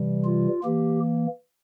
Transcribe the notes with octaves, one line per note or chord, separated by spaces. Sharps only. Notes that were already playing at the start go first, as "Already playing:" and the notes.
Already playing: C3 E3 G3
F4
E3 A#3 G4